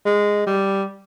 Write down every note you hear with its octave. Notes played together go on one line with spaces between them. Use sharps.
G#3
G3